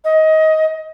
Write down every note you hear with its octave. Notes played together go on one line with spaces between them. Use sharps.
D#5